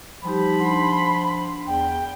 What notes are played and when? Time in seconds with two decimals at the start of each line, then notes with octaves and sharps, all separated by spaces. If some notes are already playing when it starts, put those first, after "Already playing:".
0.25 F3 G3 D#4 G4 B5
0.59 D4 F#5 C6
1.67 E2 G5